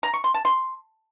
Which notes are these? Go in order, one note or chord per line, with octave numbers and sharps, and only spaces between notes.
A#5
C#6
C6
A5
C6